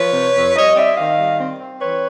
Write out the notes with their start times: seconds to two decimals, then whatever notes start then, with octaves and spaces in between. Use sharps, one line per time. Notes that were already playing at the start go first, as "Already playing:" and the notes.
Already playing: F3 B4 C#5
0.13 C3
0.35 F2
0.55 G3 C#5 D#5
0.76 C4 D5 E5
0.96 D#3 D#5 F5
1.18 G3
1.38 C4
1.59 C4
1.80 E3 B4 C#5